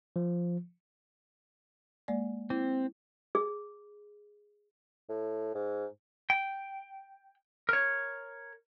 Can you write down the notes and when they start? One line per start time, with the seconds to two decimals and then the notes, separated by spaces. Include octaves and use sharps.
0.16 F3
2.08 G#3 A#3 D5
2.50 C4 E4
3.35 G#4
5.09 A2
5.55 G#2
6.30 G5
7.69 A#4 C#5